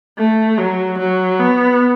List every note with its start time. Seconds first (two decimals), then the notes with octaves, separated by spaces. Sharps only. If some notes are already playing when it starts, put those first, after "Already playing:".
0.18 A3
0.59 F#3
0.99 F#3
1.40 B3